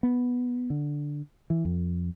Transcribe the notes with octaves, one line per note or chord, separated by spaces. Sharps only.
B3
D3
E3
F2